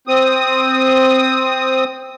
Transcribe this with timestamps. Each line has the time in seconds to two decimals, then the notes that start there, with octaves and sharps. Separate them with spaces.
0.08 C4 D#6